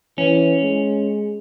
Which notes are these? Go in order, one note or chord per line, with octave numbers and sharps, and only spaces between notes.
E3 C#4
G#3